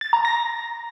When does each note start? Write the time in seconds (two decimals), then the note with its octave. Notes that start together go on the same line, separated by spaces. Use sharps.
0.01 A6
0.13 A#5
0.25 A#6